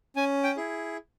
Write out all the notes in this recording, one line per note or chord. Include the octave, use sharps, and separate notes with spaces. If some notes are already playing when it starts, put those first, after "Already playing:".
C#4 G#5
G5
E4 G#4